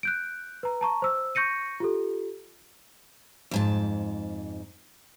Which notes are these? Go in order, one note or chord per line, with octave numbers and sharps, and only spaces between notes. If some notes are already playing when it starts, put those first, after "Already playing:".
F#6 G6 D7
B4 A#5
A5 A#5 C#6
C5 E6
C#6 G6 A#6 C#7 D#7
F4 G4 A4
F2 G#2 A5